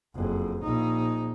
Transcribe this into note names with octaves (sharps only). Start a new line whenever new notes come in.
F#1 F2
A#1 D#4